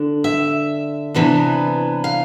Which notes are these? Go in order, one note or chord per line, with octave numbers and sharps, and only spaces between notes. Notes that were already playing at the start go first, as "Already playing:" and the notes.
Already playing: D3 D4
E5
C3 E3 B3 D4
F5